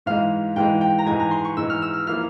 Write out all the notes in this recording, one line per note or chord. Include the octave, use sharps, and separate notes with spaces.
G#2 E3 G#3 F5
G#2 E3 G#3 G5
G5
A#5
G#2 E3 G#3 G#5
A#5
C6
C#6
G#2 E3 G#3 E6
F6
E6
F6
F3 A#3 E4 F6